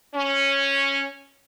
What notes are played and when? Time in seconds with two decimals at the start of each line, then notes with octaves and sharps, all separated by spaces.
0.15 C#4